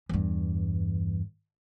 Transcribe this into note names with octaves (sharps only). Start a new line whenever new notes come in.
E2 G2